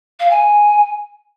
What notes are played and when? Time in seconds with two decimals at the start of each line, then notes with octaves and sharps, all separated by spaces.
0.19 F5
0.30 G#5